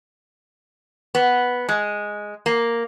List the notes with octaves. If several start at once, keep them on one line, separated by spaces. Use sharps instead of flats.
B3
G#3
A#3